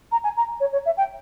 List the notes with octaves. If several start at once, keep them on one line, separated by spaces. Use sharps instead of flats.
A#5
G#5
A#5
C#5
C#5
E5
G5